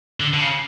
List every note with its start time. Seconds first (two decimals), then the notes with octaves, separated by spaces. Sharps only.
0.20 D3
0.33 D3
0.40 C#3